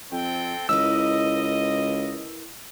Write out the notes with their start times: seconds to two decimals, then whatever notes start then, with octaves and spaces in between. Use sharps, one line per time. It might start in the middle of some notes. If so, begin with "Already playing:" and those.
0.12 F2 C4 A4 G5
0.69 C#2 E4 A#4 B4 D#5 E6